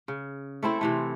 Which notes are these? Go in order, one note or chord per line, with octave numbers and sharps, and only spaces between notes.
C#3
A3 C4 E4 A4
C3 E3 A3